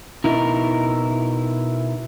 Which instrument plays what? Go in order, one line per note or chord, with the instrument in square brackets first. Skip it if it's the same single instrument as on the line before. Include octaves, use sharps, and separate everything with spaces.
[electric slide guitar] B2 D#4 E4 A#4